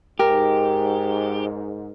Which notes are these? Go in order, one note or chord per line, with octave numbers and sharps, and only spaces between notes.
G#2 G4 A#4